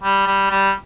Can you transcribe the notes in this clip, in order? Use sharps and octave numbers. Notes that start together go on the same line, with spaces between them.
G3
G3
G3